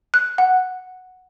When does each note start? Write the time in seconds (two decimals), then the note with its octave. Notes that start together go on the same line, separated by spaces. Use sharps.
0.14 F#6
0.38 F#5